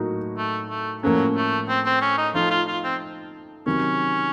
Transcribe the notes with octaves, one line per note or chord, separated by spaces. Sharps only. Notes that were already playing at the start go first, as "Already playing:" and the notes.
Already playing: A2 F#3 A#3 D#4 F#4
A3
A3
A2 F3 F#3 A#3 C#4 A4
A3
C4
C4
C#4
D#4
F3 A3 D#4 F4
F4
F4
C4
C3 D#3 F#3 C#4